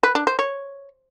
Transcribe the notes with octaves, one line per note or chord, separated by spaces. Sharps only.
B4
D4
C5
C#5